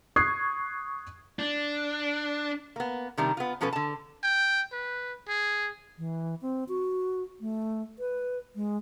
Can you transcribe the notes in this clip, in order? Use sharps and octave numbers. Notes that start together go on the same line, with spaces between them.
C#6 D#6 F#6 G#6 C7
D4
A#3 B3
C3 D#3 G3 D4
B3 F4
B2 F3 C#4 A4 B4
D3 A5
G5
B4
G#4
E3
C4
F#4
A3
B4
G#3